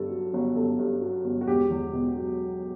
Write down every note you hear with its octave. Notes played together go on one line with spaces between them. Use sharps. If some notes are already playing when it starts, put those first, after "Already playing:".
Already playing: G1 G2 A4
F#3
G1
G1 A4
G2
F#3
G1
F#4
E1 G4
E2
B2
F#3